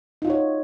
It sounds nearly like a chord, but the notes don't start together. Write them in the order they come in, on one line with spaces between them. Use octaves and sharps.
D#4 F4 F#4 C#5